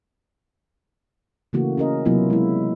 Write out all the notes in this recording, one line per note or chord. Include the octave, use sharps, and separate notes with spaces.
C#3 E3 A3 A#3 F#4
C#4 A#4 D#5
C3 F#3 A#3 B3 E4 F4
G#3 E4